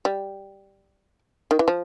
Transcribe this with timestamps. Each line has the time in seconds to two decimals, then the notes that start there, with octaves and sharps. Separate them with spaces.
0.05 G3
1.51 D#3
1.59 E3
1.68 F3